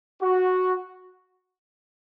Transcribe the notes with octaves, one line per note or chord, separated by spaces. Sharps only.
F#4